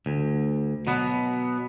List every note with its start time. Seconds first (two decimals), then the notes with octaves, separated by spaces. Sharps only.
0.06 D2
0.87 B2 F#3 B3